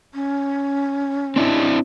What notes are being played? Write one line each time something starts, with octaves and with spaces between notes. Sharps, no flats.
C#4
C4 D4 E4